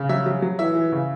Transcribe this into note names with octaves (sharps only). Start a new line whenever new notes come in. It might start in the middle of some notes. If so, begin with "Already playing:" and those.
Already playing: C#3
F#3 E5
F#3
F#3
E3 E5
E3
C#3